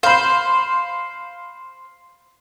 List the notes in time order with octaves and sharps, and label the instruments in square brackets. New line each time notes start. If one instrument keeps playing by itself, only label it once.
[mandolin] C5 [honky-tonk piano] F5 B5